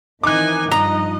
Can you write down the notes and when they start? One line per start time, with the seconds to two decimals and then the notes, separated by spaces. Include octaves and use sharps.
0.23 D#3 E3 C4 D#4 G#5 D6 F#6
0.72 G2 F3 D#4 D#5 A#5